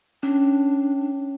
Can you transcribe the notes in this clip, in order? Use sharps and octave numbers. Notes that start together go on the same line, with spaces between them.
C#4 D4